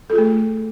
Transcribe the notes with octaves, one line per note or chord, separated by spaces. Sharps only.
A3 F4 G#4 A4